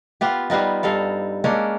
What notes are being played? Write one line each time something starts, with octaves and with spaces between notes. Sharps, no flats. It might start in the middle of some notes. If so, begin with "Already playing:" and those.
B3 F4 G4
G3 B3 D#4 F4
G2 D#4 A4 F5
G#3 A#3 C#4 D4